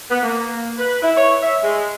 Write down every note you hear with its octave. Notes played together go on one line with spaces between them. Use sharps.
B3
A#3
B4
E4
C#5
E5
G#3